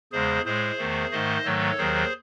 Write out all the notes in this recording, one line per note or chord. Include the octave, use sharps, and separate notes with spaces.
E2 C#3 G#3 G#4 C5
A2 G#3 G#4 C5
E2 D#3 A3
G#2 D#3 A3 C5 D#5
G#2 D#3 F#3 A3 A4 C#5
D#2 D#3 F#3 G#4 C5